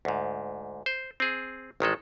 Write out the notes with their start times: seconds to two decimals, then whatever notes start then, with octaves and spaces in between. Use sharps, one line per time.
0.05 D2 G#2
0.86 C5
1.20 C4 G#4
1.80 A1 D#3 G#3 A4